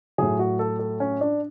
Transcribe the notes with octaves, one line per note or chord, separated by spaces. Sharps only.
A2 F#3 G#4
F#4
A4
A4
C#4
D4